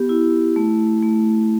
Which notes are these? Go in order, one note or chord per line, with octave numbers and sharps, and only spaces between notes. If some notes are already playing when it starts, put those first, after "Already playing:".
Already playing: B3 G4
E4
A3
A3